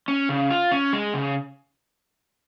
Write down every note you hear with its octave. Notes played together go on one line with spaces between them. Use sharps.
C#4
C#3
F4
C#4
G#3
C#3